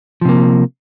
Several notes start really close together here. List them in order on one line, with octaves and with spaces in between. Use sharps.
F3 C3 A#3